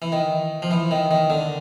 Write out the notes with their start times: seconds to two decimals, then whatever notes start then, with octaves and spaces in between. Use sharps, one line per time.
0.02 E3
0.12 D#3
0.62 F3
0.71 E3
0.91 D#3
1.11 D#3
1.30 D3